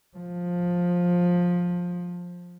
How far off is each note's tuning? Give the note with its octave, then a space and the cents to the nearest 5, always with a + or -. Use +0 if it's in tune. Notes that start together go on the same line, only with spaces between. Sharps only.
F3 +15